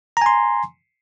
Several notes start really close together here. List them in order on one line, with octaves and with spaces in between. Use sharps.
A#5 G#5 C6